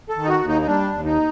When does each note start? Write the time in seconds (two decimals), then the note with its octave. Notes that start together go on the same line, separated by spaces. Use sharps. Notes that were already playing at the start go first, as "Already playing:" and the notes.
0.09 A4
0.16 D#3
0.24 D#4
0.28 F#4
0.42 D#2
0.48 D#4
0.62 D#4
0.66 G3 D4
0.93 D#2
1.06 D#4